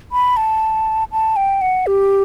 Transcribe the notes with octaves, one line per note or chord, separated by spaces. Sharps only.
B5
A5
A5
G5
F#5
G4